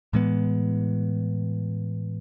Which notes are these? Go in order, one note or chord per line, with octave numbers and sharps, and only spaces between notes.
A2 E3 G#3 B3